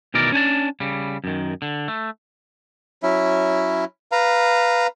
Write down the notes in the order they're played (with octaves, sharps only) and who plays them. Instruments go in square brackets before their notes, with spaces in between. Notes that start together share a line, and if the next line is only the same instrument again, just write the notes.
[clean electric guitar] B2 D#3 E3 A#4 D5
C#4 D4 G#5 A5
C#3 G3
F#2 D#3
D3
A3
[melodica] F#3 C#4 E4 E5
B4 F5 A#5